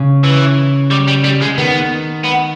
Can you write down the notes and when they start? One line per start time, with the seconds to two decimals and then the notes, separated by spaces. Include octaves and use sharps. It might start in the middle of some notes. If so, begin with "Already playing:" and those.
Already playing: C#3
0.24 E3
0.91 G3
1.08 G3
1.24 G3
1.42 G#3
1.58 D#3 B3
2.25 B3